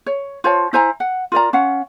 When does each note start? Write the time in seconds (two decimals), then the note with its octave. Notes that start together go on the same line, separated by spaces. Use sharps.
0.06 C#5
0.44 F4 C5 C#5 A5
0.73 E4 C5 G#5 A#5
1.00 F#5
1.32 F4 A#4 D5 A#5
1.53 C#4 F5 F#5